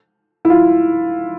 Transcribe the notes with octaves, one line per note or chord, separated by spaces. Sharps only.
E4
F4